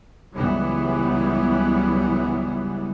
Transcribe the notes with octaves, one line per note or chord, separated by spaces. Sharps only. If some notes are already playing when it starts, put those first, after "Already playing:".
C#2 E3 F#3 G3 B3